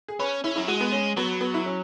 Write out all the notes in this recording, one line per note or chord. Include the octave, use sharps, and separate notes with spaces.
G#4
C#4 B4
C#4 E4
F#3 E4
G#3 F#4
B3
C#4
F#3 B3
B3
E4
C#4